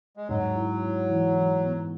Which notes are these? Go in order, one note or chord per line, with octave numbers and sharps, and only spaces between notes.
G#3
G#2 F#3
E4
E4
E3
E3
B3